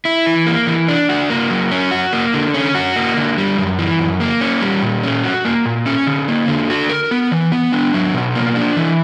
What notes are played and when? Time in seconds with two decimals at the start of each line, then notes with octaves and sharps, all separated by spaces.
0.05 E4
0.26 E3
0.46 A#3
0.67 E3
0.88 D4
1.09 F#4
1.30 A#3
1.50 F#3
1.71 C#4
1.91 F#4
2.13 A#3
2.34 D3
2.54 C#4
2.75 F#4
2.96 A#3
3.17 D3
3.38 G3
3.57 F#2
3.79 E3
3.99 F#2
4.20 A#3
4.41 C#4
4.61 G3
4.82 A#2
5.03 C#4
5.24 F#4
5.45 A#3
5.66 A#2
5.86 C#4
6.07 D3
6.28 A#3
6.48 D3
6.70 F#4
6.89 A#4
7.11 B3
7.32 E3
7.52 B3
7.72 D4
7.94 F#3
8.14 B2
8.35 A#3
8.56 D4
8.77 E3